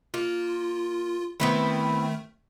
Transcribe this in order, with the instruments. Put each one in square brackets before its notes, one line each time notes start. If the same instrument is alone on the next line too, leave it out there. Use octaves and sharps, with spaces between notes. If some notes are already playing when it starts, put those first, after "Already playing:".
[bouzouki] A#3 [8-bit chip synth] F4
[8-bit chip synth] D#3 A3 [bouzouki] B3 C4 E4